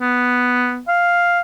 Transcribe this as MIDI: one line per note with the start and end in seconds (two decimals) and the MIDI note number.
0.01 0.81 59
0.88 1.41 77